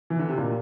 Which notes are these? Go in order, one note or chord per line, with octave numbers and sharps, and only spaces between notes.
E3
D3
C3
A#2